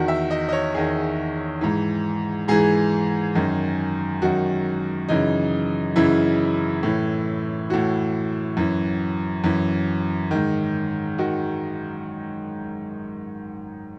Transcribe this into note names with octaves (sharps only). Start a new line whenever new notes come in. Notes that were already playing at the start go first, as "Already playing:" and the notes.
Already playing: E2 D#3 F#4
E5
D#5
D#5
C#5
E2 D#3 G#4
G#2 E3
G#2 E3 G#4
F#2 D#3
F#2 D#3 F#4
F#2 C#3 E3 D#4
F#2 C#3 E3 E4
A2 E3
A2 E3 F#4
F#2 E3
F#2 E3
G#2 D#3
D#3 F#4